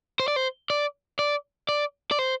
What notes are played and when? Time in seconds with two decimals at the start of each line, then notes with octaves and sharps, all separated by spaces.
0.20 C5
0.28 D5
0.36 C5
0.70 D5
1.19 D5
1.69 D5
2.11 D5
2.19 C5